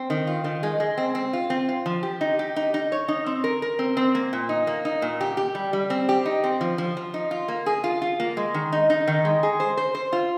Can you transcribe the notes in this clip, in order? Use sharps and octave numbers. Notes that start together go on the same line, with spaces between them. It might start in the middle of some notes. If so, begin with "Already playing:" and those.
Already playing: C4
D#3
F4
D#3
G#3
G#3
C4
C4
F4
C4
F4
F3
G4
D#4
G4
D#4
D#4
C#5
D#4
C4
A#4
A#4
C4
C4
A#3
A#2
D#4
A#3
D#4
A#2
G4
G4
G3
G3
C4
G4
D#4
C4
F3
F3
F3
D#4
F4
A#3
G#4
F4
F4
A#3
G#3
D#3
D#4
D#4
D#3
G#3
G#4
C5
C5
C5
F4